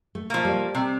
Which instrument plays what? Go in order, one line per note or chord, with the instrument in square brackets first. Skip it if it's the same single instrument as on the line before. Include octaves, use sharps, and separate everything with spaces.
[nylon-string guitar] A3
[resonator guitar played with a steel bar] F3 A#3
[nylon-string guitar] G3
[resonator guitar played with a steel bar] C3